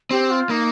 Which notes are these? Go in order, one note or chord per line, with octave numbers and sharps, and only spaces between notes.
C4 G4
F4
A#3 D#4